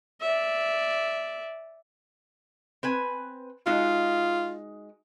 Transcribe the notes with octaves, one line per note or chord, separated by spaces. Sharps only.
D5 E5
C4 B4 G#5
G#3 D#4 F4 F#4